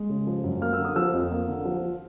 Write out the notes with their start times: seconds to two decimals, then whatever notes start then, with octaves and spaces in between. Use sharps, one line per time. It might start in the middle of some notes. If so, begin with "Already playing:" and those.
Already playing: G#3
0.09 C#3
0.27 F3
0.44 F#2
0.62 A#3 F6
0.73 E6
0.79 D3
0.85 D#6
0.96 F3 E6
1.14 F2
1.31 A#3
1.48 D3
1.65 F3